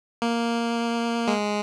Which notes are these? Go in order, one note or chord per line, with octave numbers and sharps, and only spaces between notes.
A#3
G#3